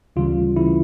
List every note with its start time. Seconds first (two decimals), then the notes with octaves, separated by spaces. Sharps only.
0.16 D2 C#3 E3 G3 F4
0.56 D2 C#3 E3 G3 E4